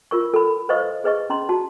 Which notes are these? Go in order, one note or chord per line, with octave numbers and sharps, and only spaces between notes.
F4 A#4 C#6
A4 B5
B4 C5 D#5 F5 C#6 D#6
G#4 B4 D#5 C#6
C#4 A#5 C6
F#4 A5